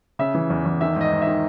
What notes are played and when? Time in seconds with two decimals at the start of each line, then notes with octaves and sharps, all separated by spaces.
0.19 C#3 E5
0.35 E3
0.50 E2
0.65 E2
0.81 D#3 E5
0.96 G#2 D#5
1.12 G#2
1.22 E5
1.27 D#3